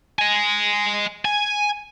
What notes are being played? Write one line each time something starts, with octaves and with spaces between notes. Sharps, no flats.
D#5 G#5
G#5